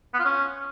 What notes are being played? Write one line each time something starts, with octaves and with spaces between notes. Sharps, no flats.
B3
F4
C#4